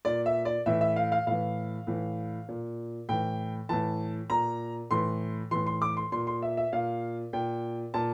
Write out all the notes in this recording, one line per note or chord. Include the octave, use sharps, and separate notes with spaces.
A#2 D5
E5
D5
A2 E3 E5
E5
F5
F5
A2 E3 F5
A2 E3
A#2
A2 E3 G5
A2 E3 A5
A#2 A#5
A2 E3 C6
A2 E3 C6
C6
D6
C6
A#2 C6
C6
E5
E5
A#2 F5
A#2 G5
A#2 A5